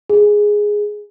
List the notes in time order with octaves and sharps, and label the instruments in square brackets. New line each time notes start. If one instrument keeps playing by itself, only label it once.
[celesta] G#4